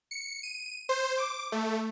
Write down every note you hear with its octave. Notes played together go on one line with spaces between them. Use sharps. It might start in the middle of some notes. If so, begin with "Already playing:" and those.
C#7
D#7
C5
D6
A3